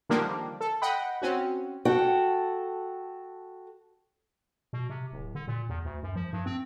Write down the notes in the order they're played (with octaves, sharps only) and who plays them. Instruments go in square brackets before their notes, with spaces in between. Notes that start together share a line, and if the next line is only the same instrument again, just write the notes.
[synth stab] D3 D#3 F3 G3 A#3 D4
A4
D#5 F#5 G5 B5
C4 C#4 F#4
[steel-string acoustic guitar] F#4 A4 G5
[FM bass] B2
C3
D1
D3
A#2
E2
D2
F#2
F3
G2
C4